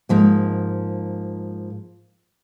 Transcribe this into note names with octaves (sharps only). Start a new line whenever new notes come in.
G#2 F3 A#3